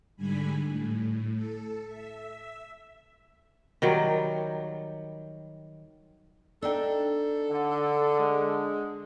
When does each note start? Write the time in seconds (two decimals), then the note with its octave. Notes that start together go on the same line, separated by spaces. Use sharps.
0.16 G#2 D3 G3 G#5 B5
0.66 A2
1.34 A4
1.87 E5
3.82 D#3 F#3 G3
6.62 D4 D#4 A4 G5
7.50 D3
8.19 G#3